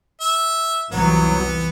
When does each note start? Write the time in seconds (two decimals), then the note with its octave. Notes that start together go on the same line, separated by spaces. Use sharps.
0.21 E5
0.92 C2 F2 E3 F#3 B3